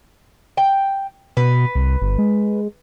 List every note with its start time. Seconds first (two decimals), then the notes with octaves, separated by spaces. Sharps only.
0.57 G5
1.37 B2 B4
1.75 C2
2.02 G1
2.18 G#3